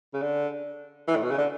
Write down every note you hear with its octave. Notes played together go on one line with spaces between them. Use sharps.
C#3
D3
E3
A2
B2
C#3
D3